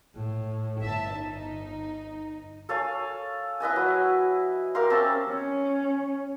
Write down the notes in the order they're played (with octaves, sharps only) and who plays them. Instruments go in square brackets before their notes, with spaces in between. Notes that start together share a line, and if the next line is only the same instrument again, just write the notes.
[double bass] A2
[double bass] G1 [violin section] E5 A5
[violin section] D#4
[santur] A4 C#5 F5 G#5
E4 B4 D#5 G#5
F#3
G4 A#4 F5 C6
C4 C#4 E5 A5
[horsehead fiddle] C#4